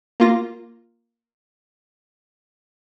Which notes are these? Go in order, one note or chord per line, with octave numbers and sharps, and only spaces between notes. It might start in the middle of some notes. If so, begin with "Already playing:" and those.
A#3 F4 A#6